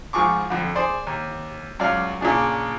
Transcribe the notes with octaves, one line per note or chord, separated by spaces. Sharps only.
G#2 F3 G#4 C#6 D6
F2 D3
G#4 C5 D5
D#2
C#2 F#2 D5 F5
A#2 C#3 D4 G#4